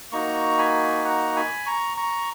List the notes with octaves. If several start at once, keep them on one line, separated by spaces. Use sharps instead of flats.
A#3 D#4 F#4 A#5 C#6
G#5 B5
F#5 A#5
G#5 B5
A#5 C#6
A#5 C#6